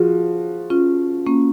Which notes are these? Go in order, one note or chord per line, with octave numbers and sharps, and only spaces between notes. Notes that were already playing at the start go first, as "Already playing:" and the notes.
Already playing: F3 F4 F#4 G#4
C#4 F4
A#3 C#4